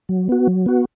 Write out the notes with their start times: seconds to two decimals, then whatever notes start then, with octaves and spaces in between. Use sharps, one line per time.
0.09 F#3
0.29 B3 F#4
0.47 F#3
0.66 B3 F#4